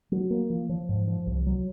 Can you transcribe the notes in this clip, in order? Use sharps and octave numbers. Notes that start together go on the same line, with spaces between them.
F#3
A#3
F3
F3
G#2
F3
C2
F#3